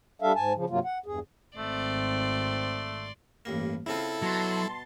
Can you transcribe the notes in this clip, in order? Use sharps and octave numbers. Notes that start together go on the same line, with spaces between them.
G3 D4 A4 E5 F5
G#2 G#5 A5
C#3 F3
G2 C3 F#3 A#3 F4
F#5
E2 G2 G#4
G#1 A3 C4 D5 C6
A1 G2 A#3
C#3 C4 E4 F4 A4
B2 F#3 A5 C6 A6